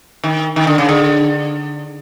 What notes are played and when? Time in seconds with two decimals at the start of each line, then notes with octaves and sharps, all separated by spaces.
0.24 D#3
0.56 D#3
0.67 D3
0.78 C#3
0.89 D3